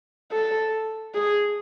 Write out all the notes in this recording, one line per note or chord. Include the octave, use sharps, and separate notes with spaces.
A4
G#4